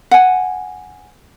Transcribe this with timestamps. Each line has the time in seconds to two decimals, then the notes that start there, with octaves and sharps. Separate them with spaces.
0.11 F#5 G#5